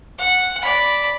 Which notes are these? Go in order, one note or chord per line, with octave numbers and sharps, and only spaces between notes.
F#5
D5 B5